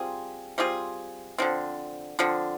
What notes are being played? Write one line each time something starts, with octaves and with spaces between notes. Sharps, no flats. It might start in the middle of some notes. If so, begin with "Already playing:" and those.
Already playing: G3 C4 F4 G#4
G3 C4 F4 G#4
D3 F3 C4
D3 F3 C4